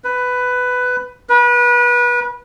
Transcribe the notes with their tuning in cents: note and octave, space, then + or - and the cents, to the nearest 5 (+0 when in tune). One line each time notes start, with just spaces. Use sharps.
B4 +10
B4 -30